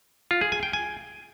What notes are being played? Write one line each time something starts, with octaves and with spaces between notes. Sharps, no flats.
F4
G#4
G#5
G5
G#5